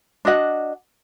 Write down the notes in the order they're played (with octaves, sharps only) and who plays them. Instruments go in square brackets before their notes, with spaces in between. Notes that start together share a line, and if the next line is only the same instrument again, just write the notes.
[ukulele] D4 F#4 D#5 F#5